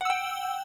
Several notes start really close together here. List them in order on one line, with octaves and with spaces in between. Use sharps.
F#5 E6 G5